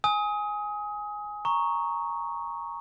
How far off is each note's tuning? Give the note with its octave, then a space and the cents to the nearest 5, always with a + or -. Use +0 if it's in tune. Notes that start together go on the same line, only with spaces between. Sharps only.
G#5 +0 D#6 +25
A#5 +0 C#6 +0